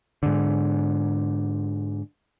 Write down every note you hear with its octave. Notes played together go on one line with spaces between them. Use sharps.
G#2 D3